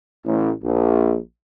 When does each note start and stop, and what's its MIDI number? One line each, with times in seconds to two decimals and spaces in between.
0.24 0.51 33
0.63 1.15 34